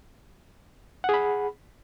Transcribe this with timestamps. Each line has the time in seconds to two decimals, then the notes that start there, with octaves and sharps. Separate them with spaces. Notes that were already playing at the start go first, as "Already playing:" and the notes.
1.04 F#5
1.09 G#4
1.14 B5